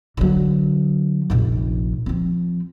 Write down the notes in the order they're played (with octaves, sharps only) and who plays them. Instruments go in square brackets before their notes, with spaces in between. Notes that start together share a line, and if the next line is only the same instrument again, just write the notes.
[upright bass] D3 F#3
F1 A#1
F3 C4